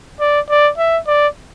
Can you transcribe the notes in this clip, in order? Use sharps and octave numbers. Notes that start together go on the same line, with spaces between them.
D5
D5
E5
D5